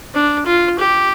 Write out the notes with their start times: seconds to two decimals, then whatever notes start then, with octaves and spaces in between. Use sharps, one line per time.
0.15 D4
0.46 F4
0.78 G4